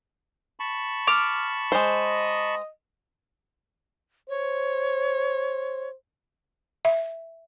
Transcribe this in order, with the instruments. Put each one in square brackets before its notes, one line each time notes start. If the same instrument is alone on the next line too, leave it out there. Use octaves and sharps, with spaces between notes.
[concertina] A5 B5 C#6
[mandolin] D6 F6
[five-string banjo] G#3 C5 [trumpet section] D#5
[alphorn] C5 [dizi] C#5
[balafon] E5